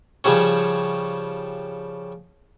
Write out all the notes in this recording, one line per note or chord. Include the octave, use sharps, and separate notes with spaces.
C#3 F3 G3 C#4